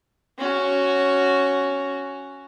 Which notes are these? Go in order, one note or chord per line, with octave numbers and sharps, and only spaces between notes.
C#4 F#4